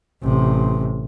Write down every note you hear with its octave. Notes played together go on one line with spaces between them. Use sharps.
A1 C3